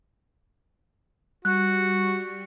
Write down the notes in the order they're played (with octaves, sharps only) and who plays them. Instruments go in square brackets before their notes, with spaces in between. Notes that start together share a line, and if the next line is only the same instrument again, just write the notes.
[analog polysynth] G3 [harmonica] F#4 [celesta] F#6